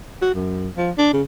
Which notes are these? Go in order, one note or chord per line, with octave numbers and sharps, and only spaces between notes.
F#4
F#2
F3
D4
C#3